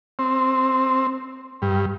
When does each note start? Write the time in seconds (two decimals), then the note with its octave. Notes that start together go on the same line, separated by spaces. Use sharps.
0.19 C4
1.62 G2